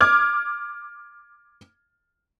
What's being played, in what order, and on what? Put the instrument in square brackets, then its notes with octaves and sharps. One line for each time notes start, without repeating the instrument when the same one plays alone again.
[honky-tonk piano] D6 F6 G#6